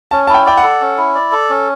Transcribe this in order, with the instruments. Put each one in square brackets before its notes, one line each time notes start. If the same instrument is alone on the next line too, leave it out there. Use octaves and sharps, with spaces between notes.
[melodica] C#4 [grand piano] A5
[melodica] E4 [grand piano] A5
[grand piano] G5
[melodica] D5 [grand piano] G5
[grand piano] F#5
[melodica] A4
C#4
E4
D5
A4
C#4